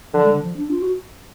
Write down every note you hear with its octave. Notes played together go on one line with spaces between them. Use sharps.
D3 F3
G#3
D3
F3
D4
F4
F#4